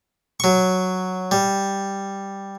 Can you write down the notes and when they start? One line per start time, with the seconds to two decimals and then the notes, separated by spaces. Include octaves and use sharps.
0.40 F#3 C#6
1.31 G3